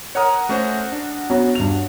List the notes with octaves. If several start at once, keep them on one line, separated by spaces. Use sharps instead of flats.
A#4 C#5 F#5 D#6
A3 C#4 F#4 C5
D4
F#3 B3 C#4 F#4
G2 F7